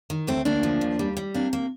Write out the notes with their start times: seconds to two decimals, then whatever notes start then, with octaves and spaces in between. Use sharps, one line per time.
0.10 D#3
0.27 D2 A3 C4
0.45 D2 A#3 D4
0.63 F3
0.81 D#2
0.99 G3
1.17 G3
1.34 C3 A#3 D4
1.53 A#3